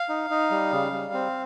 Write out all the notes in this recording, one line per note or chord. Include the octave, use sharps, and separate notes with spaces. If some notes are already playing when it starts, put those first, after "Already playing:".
Already playing: F5
D#4
D#4
G3
C#3
G3
C4